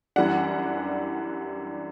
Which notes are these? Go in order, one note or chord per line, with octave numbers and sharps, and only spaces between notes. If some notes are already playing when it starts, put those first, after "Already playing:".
F#2 E3 G3 D4 F#5